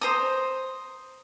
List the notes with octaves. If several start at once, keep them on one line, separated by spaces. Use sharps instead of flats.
C5 A#5 D#6